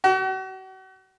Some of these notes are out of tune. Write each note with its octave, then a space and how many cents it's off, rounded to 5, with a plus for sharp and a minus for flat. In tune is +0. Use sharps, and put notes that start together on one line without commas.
F#4 +40